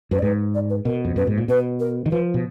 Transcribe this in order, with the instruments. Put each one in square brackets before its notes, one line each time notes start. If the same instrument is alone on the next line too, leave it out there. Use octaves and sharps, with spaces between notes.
[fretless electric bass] F#2 [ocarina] B4
[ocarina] D5
[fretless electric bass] G#2 [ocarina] B4
[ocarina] D5
B4
[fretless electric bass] B2 [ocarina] A#4
[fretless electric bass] F2
[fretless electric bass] F#2 [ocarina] B4
[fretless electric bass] G#2
A#2
[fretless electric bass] B2 [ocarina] B4
[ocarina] A#4
[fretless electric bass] D#3
[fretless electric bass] F3 [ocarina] B4
[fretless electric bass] B2